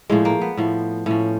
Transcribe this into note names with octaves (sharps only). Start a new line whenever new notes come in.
A2 F3 G#3
A#3
B3
A2 F3
A2 F3 C#4